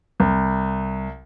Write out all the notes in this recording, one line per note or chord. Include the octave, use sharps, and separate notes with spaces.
C2